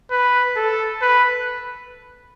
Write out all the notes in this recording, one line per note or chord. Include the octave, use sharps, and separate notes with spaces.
B4
A4
B4